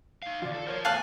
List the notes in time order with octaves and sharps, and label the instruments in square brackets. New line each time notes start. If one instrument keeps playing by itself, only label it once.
[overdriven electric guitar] D#4 F5
[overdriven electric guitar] D#2 E3 [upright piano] F4 D5
[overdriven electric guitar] A4
[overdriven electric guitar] F4 C5 [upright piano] A#4 C#5
[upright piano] E2 A3 [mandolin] F5 A5 F#6 [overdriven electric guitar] G#5